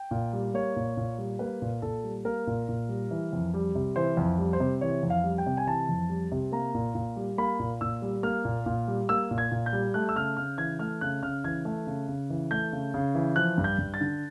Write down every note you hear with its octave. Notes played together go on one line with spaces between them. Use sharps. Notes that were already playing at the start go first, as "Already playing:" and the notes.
Already playing: G5
A#2
G3
A#3 C#5
A#2
A#2
G3
A#3 B4
A#2
A#2 A4
G3
A#3 A#4
A#2
A#2
G3
E3
F2
G3
C3
E3 C5
F2
G3
C5
C3
E3 C#5
F2
F5
G3
G5
C3
G#5
E3 A5
F2
G3
C3
A#3 A#5
A#2
A#2
G3
A#3 B5
A#2
A#2 E6
G3
A#3 F6
A#2
A#2
G3
A#3 E6
A#2
G#6
A#2
G6
G3
A3 F#6
E6
C#3 F6
C#3 F6
E3 G#6
A3 F6
C#3 F#6
C#3 F6
E3 G#6
A3
C#3
C#3
E3
A3 G6
C#3
C#3
E3
F3 F#6
G2
G6
G2
A6
D3